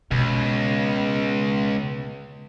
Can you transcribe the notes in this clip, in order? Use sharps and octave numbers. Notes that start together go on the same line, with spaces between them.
C#2 B2